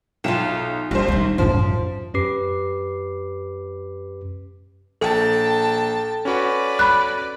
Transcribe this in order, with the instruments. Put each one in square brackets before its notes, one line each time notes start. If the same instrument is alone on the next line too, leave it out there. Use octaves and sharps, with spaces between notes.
[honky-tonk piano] B1 E7 [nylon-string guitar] F4 E5 G5
[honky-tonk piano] A#1 C5 [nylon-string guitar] F3 D4 G4 [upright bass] G3
[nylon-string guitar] C3 D#3 [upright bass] G3
[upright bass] A1 F#2 [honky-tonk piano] F3 [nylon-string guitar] C5
[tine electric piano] F#2 C#4 G4 B4 D6 C7
[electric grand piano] A#1 [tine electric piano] A4 [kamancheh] G5 A5
[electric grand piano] C#4 F#4 [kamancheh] B4 D5
[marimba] B5 F#6